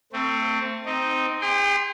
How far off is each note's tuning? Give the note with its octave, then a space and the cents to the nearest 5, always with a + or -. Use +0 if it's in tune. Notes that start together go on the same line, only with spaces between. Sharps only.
A3 +30 C4 +0
C4 -10 D#4 +0
G#4 -45 G5 +0 C6 +0